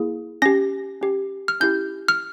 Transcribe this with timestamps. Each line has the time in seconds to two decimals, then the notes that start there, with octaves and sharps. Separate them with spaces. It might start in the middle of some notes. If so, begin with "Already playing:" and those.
Already playing: A#3 E4 G#4
0.42 C#4 G4 A#6
1.01 C#4 G4
1.48 F6
1.60 C#4 E4 G4 G6
2.08 F6